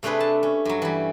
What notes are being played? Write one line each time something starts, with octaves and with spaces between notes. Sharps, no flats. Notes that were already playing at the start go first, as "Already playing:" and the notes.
C3 A3 D4 G#4 B4
A5
C#4
G2 F#3
E3 G3